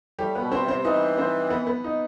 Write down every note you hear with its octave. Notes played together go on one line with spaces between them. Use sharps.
A2 G3 G4
B3 B4
B2
C4 C5
C3
C4 C5
E3 D#4 D#5
C4 C5
B3 B4
B3 B4
D#4 D#5